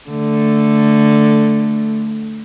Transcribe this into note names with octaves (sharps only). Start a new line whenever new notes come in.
D3 A3